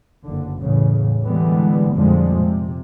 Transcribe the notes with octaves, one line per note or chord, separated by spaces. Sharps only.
F#1 D3
E2 A2 C#3
D3 E3 G3 G#3 B3
F2 A#2 D3 F3 G3 G#3
C3